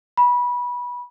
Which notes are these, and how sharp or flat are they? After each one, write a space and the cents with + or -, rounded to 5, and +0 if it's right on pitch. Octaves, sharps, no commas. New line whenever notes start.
B5 -20